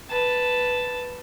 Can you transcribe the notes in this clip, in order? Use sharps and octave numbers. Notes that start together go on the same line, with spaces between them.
B4 A5